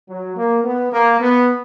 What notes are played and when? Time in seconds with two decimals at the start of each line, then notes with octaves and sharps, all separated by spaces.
0.09 F#3
0.37 A#3
0.65 B3
0.92 A#3
1.21 B3